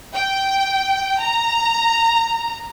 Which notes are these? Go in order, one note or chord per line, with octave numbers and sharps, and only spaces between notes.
G5
A#5